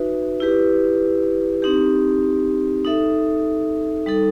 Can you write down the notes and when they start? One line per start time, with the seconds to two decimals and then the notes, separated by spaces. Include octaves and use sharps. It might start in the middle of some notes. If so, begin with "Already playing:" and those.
Already playing: D#4 F#4 B4 E5
0.40 E4 G4 B4
1.62 C4 D#4 G4
2.85 D#4 A4 E5
4.06 G3 D#4 A4